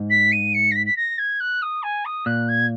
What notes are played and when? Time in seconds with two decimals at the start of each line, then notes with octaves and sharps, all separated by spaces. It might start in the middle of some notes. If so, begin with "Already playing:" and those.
Already playing: G#2
0.10 B6
0.32 D#7
0.54 C#7
0.71 A#6
0.75 B6
0.86 B6
0.96 A#6
1.18 G#6
1.40 F#6
1.62 D#6
1.83 G#5
2.05 D#6
2.26 A#2 F#6
2.48 G#6